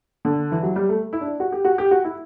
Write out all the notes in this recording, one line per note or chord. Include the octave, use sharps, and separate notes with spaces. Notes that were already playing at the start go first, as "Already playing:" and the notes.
D3
E3
F#3
G3
A3
E4
D4
F#4
G4
F#4
G4
F#4
E4